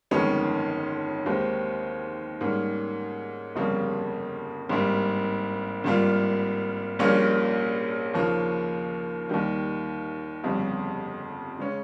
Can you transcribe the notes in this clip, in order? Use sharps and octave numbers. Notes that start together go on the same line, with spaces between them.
G1 F2 D#3 G#3 C#4
D#2 D#3 G#3 C4 G4
G#2 G3 A#3 C#4 G#4
G1 F2 C#3 G3 A#3
G#1 G2 G3 A#3
G#1 G2 G3 A#3 F4
A#1 A#2 G3 A#3 C#4
D#2 C#3 F3 A#3
D#2 D#3 G3
G1 F2 C#3 G3
C#3 G#3 C#4